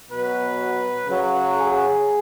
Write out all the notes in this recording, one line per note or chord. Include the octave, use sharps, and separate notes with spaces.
B2 F#3 B4
C#3 F#3
G#4